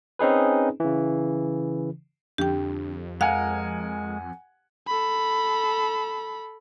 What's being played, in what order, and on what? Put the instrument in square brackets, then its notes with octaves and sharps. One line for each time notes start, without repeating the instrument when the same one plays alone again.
[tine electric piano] C4 C#4 D#4 G#4 B4
C#3 E3
[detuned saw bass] F2 [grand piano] D3 [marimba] G4 G5
[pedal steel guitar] G#3 A#4 [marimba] F5 [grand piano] F#5 G#5
[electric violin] A4 B5